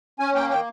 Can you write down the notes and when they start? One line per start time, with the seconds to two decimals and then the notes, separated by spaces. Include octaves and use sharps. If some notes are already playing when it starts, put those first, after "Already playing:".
0.20 C#4 G#5
0.35 A#3 G5
0.50 D#3 G5